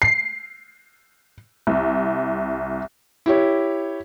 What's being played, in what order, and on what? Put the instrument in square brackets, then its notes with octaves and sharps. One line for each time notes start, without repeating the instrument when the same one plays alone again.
[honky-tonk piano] C7
C2
[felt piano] E4 G4 C#5